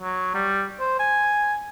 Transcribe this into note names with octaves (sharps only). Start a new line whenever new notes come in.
F#3
G3
C5
G#5